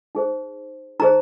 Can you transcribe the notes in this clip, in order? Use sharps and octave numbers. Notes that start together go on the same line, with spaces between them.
D#4 G#4 C5
D#4 G#4 C5 A#5